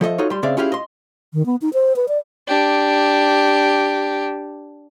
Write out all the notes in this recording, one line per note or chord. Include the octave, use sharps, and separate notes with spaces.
F3 A4 D#5 E5
D#4 F4 F#4 A4 C#5 D#5
G3 C6
C#3 C4 G#4 D5 E5 F5
C#4 E4 F4 G4 G#4 F5
D#5 C6
D#3
B3
D#4
C5
B4
D5
D4 G4